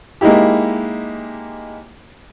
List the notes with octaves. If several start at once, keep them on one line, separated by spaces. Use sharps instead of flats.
G#3 A#3 D#4 E4 G4